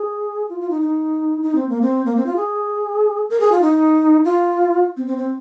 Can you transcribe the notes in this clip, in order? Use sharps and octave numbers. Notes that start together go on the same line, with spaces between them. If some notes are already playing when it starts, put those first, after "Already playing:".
Already playing: G#4
F4
F4
D#4
D#4
D#4
C4
A#3
C4
A#3
C4
F4
G#4
A#4
G#4
F4
D#4
F4
C4
C4
C4